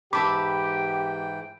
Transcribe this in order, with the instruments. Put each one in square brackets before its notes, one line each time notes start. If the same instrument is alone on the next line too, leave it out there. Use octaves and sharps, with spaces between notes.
[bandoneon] G#2 E3 G5 [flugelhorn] G4 [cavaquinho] E5 A5 B5 [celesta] D6